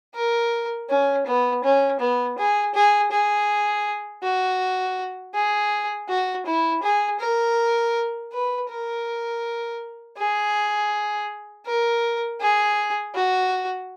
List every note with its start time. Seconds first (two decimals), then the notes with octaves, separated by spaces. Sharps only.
0.15 A#4
0.89 C#4
1.27 B3
1.64 C#4
2.00 B3
2.38 G#4
2.75 G#4
3.11 G#4
4.23 F#4
5.34 G#4
6.09 F#4
6.46 E4
6.83 G#4
7.20 A#4
8.33 B4
8.70 A#4
10.18 G#4
11.66 A#4
12.40 G#4
13.15 F#4